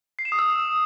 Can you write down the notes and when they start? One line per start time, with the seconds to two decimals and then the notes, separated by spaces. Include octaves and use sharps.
0.19 C7
0.25 E7
0.32 D#6
0.39 E6